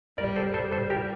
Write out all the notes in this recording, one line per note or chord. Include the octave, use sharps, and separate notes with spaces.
G3 A#4 D5
A4 C5
G3 A4 C5
A4 C5
G4 A#4